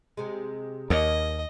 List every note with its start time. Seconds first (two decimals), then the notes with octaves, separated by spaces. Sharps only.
0.17 C3 G#3
0.90 D#2 A#4 C#5 D#5